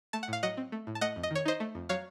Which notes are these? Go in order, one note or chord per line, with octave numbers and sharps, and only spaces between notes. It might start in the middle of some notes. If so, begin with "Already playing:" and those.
A3 A5
F#5
A2 F5
F#3 D#5 F#5
C4
A3
A2
A5
A3 D#5 F#5
F2
D#5
D#3 C#5
D#4 C5 D#5
A3
F2
F#3 C#5 F5